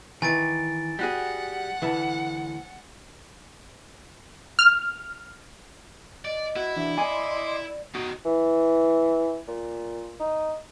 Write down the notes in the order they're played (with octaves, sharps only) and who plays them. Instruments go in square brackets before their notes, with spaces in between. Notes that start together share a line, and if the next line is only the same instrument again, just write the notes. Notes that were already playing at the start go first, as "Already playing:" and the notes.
[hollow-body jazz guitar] D#3 E3 [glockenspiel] G#5 A6 D7
[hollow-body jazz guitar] G3 F#4 G#4 [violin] F#5
[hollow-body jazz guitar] D2 E3 A5
[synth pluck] F6
[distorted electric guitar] D5 [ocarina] D#5
[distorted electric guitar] E4 [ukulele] F#4
[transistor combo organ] E3 D4 [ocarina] E5
[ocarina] D5 [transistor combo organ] D#5 C6 D6 [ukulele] G#5 B5
[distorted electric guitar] B2 D#3 [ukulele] F#4 [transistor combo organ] D#6
[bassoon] E3
A#2
D#4